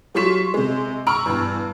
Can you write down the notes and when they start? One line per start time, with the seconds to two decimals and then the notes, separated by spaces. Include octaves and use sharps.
0.15 F#3 G3 F4 C#6 B6 E7
0.54 C3 G#3
1.07 A#5 B5 C#6 E6 F6 D7
1.26 E2 G2